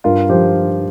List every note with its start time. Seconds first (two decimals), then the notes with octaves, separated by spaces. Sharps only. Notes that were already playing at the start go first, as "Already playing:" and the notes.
0.04 G2 F4 A#4
0.29 F3 G4 C5